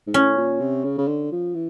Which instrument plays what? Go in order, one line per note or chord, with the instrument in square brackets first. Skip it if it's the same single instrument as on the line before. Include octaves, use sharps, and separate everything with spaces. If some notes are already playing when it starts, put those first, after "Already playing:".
[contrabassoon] G#2
[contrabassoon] A2 [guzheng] C#4
[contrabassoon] A#2
C3
C#3
C#3
D3
F3
E3